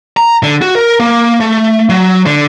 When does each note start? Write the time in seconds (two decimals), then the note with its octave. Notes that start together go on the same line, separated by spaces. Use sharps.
0.17 A#5
0.43 D3
0.62 F#4
0.75 A#4
1.00 A#3
1.40 A3
1.89 F#3
2.26 D3